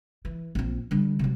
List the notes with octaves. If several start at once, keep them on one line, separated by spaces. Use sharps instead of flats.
E3
A#1 C4
D3 G3
C3 F#3